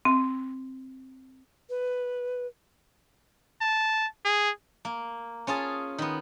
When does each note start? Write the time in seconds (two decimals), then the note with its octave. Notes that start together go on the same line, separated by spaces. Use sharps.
0.05 C4
1.70 B4
3.61 A5
4.25 G#4
4.85 A#3
5.47 C#4 F4 G#4 A5
5.98 D#3 B3